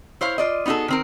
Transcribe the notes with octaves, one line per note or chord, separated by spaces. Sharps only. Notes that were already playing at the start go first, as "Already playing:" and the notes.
E4 C5 C#5 F5
F4 D5 D#5
B3 D#4 F#4 G#4 A4
D#3 C4 A#4